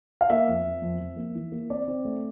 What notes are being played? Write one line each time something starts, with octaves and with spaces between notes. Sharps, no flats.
F5
A#3 E5
F2
F2
F2
F2
A#3
E3
A#3
C4 D5
C4
A3